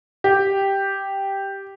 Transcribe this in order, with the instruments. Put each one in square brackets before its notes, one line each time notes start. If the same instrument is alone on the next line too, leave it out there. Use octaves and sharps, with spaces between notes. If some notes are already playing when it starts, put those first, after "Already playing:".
[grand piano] G4